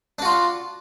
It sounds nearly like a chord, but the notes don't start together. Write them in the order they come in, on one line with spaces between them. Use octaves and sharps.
D4 F#4 F4